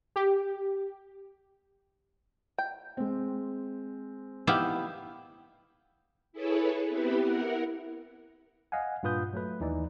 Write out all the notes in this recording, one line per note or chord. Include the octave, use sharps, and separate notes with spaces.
G4
G5
G#3 C4
B3 D#4 E4 G4 F5 G5
E4 G#4 A4 B4 C#5
B3 C4 E4 G4 B4
E4 A#4 F#5
D#5 F5 F#5 G#5
G2 A#2 F4 B4 D#6 G6
F#3 A3 B4
D#2 E3 D#4 D5